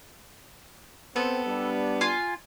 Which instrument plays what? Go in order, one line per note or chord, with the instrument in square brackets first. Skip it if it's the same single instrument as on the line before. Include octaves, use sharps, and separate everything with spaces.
[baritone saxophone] B3 [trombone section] C4 [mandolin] A4
[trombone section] G3 D4
[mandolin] F4 G#5